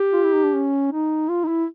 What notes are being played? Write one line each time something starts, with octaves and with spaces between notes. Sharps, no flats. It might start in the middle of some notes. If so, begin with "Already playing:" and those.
Already playing: G4
F4
E4
D#4
D4
C#4
D#4
F4
D#4
E4